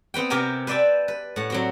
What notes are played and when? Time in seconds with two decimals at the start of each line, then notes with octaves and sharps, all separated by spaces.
0.14 B3 C4 B4 G5
0.30 C3 G4 A#4 G#5 A#5
0.67 B4 C5 D5 E5 G5 A5
1.08 B4
1.36 A2 F#5
1.50 F#3 C4 F#4